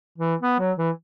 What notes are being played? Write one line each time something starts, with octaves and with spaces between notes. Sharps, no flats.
E3
B3
F#3
E3